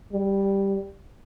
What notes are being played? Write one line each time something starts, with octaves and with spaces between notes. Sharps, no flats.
G3